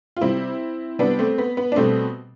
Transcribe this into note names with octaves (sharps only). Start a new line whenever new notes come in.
F4
C3 G3 C4 E4
C3 G3 B3 D4
A3 C4
B3
B3
D4
B2 G3 A3 C4